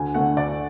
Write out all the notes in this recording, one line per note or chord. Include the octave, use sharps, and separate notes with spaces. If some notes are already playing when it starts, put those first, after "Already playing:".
Already playing: D2 G#5
D3 A3 F#5
D2 D5